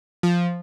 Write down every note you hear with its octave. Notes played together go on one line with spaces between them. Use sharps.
F3